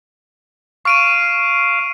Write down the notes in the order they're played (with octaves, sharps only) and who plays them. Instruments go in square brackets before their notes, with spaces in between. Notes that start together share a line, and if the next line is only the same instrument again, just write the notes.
[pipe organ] F5 [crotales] C#6 D7 D#7